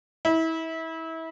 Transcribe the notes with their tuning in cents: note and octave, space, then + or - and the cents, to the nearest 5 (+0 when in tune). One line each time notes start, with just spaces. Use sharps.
E4 -30